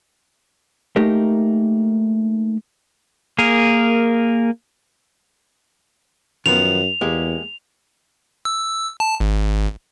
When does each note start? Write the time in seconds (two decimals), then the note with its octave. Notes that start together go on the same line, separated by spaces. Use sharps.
0.96 A3 A#3 D#4 G4 A#4
3.38 A#3 G#4 A#4
6.46 F#2 D#3 F3 B3 F7
7.01 E2 G#3 A#3 G4
8.45 E6
9.00 A5
9.20 G#1